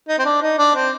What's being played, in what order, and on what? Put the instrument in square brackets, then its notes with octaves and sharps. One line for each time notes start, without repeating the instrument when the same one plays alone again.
[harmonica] D#4
C4
D4
D#4
D4
C4